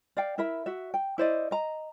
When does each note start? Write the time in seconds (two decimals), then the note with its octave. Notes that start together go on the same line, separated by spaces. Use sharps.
0.17 D5 F5 G5
0.38 E4 A#4 E5 B5
0.66 F#4 E5
0.94 G5
1.18 E4 C5 D5 D#5
1.51 D#5 A#5